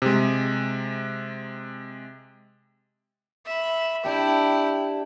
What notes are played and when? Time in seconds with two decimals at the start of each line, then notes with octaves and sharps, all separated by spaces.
0.02 C3 G#3
3.46 E5 B5
4.04 D4 E4 G4 G5